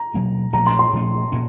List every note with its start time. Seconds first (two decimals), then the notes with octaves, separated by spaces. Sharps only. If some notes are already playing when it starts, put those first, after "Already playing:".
Already playing: A#5
0.14 B2 F#3 A#3 C#4
0.53 A#2 F3 A3 C#4 A#5
0.67 C6
0.79 C6
0.93 A#2 F3 A3 C#4
1.32 A#2 A#3 C#4